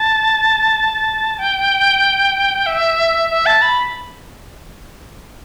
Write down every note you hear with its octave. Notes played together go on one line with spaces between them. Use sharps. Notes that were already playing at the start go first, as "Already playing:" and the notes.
Already playing: A5
G5
E5
E5
A5
B5